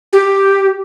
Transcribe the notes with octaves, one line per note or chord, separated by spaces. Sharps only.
G4